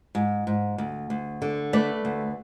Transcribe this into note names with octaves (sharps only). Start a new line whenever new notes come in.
G#2
G#2
D2
D2
D3
A3 B4 D5
D2